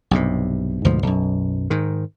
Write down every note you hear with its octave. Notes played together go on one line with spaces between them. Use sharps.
B1 G2 C3
D2 G#2 B2 F3
B1 F#2
G#2 D#3